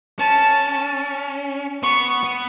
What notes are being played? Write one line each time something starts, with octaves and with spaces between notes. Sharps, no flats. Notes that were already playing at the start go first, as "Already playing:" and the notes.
C#4 A5
B3 C#6
B3